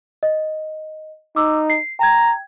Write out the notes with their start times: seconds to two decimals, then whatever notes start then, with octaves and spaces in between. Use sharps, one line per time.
0.23 D#5
1.36 D#4 D6 E6
1.70 C7
1.99 G5 A#5 G#6